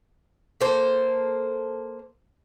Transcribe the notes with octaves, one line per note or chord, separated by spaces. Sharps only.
A#3 A4 C5